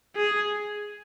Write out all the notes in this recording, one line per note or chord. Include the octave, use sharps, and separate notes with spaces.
G#4